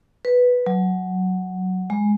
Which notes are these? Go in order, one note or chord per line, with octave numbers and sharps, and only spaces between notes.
B4
F#3
G#3